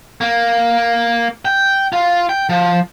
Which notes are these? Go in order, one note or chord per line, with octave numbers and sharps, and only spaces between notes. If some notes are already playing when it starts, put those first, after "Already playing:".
A#3
G5
F4
G5
F3